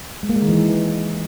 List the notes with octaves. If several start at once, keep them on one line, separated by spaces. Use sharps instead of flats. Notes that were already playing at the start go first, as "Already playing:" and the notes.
G#3
A#3
G#3
D#3
E3